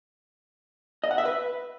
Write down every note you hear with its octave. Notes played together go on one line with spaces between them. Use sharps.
D#5
F#5
E5
B4